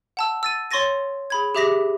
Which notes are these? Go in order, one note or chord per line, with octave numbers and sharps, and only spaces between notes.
F#5 A5 E6
E6 A6 D#7
C#5 C6 C#6 A6 A#6 D#7
G#4 B5 G#6
G4 G#4 E5 D6 A#6 B6